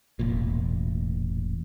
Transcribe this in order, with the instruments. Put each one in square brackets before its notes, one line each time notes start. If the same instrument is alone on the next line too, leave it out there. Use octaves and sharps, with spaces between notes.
[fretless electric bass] E1 A1 A#2